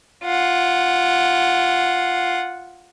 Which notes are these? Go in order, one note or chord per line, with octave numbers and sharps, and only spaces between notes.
F4 F#5